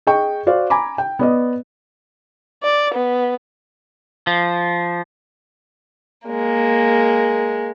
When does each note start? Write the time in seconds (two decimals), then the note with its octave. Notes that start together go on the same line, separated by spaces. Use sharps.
0.07 G#4 D#5 G5 C#6
0.47 F#4 C5 D5 F5
0.70 G#5 A#5 B5 D6
0.98 G5
1.19 B3 D5 D#5
2.63 D5
2.94 B3
4.27 F3
6.26 G#3 A#3